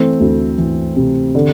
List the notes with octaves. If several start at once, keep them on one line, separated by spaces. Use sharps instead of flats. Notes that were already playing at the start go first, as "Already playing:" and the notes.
Already playing: E3 A3 C4
D2
E3
C3
D3